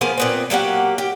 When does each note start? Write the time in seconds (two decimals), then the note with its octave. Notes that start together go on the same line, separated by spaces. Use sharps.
0.01 F3 A#3 B3 G#4
0.18 A#2 B3 C4
0.50 F#3 A#3 G4 F#5
0.98 G4